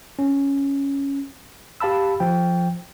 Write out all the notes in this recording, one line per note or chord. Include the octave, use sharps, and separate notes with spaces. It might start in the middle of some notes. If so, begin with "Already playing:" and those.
C#4
G4 F5 A5 B5 E6
F3 G5